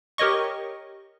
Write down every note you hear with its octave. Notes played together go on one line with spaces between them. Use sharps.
G4 A#4 C#5 D#5 C#6